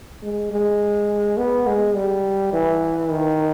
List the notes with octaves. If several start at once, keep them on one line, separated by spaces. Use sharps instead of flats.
G#3
G#3
B3
G#3
G3
E3
D#3